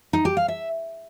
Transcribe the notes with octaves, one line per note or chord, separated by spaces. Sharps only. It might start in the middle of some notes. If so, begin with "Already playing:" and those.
D#4
G4
F5
E5